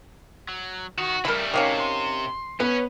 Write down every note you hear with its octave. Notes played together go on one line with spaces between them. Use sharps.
F#3
D#3 F#4
C#3 G3 A3 E4 A#4 B5
C3 D#3 A#3 C#4
C6
B3 C#4 B4